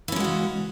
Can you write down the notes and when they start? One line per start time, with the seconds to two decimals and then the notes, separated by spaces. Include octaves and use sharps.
0.08 E3
0.12 C#4
0.16 G#3
0.20 F#4
0.24 C#3